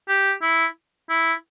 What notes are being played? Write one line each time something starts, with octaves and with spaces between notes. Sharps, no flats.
G4
E4
E4